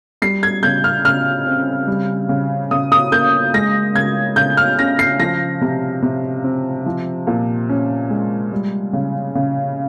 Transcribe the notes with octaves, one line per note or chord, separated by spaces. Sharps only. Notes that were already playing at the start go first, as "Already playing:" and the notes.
G3 C7
G#6
C#3 G6
F6
C#3 F6
C4
G3
C#3
C#3 D#6
D#6
A#3 G6
G#3 A#6
C#3 G#6
C#3 G6
F6
C#4 A#6
C7
F3 A#6
C3
C3
C4
F3
A#2
C#4
G#3
G3
C#3
C#3